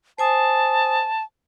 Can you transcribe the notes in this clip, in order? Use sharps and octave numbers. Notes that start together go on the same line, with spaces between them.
C5 G#5 A5 D#6